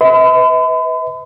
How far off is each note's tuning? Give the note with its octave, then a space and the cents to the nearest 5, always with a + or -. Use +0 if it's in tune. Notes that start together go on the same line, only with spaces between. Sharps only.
B4 +25 E5 -45 B5 +45